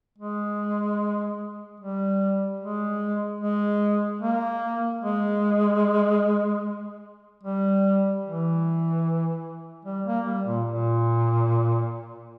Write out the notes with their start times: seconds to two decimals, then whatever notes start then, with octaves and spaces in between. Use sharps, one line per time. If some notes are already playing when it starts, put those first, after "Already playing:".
0.18 G#3
1.80 G3
2.60 G#3
3.41 G#3
4.21 A#3
5.02 G#3
7.44 G3
8.24 E3
9.86 G3
10.06 A#3
10.26 G3
10.46 A#2
10.67 A#2